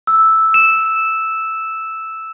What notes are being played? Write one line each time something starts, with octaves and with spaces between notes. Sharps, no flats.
E6
E7